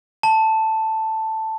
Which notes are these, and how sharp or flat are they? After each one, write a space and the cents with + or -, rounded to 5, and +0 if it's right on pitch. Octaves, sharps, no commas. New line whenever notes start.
A5 +5